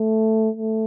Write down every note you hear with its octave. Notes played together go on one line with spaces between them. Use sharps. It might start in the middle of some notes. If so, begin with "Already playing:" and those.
Already playing: A3
A3